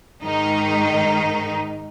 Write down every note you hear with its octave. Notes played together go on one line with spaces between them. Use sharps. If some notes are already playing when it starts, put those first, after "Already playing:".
G#2 D#3 D#4